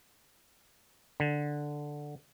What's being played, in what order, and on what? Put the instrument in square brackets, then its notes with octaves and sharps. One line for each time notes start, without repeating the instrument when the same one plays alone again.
[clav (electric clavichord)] D3